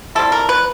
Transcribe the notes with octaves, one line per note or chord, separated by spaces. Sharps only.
G3 C4 E4 A4
A#4
B4